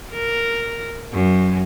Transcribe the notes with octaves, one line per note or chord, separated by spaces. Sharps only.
A#4
F#2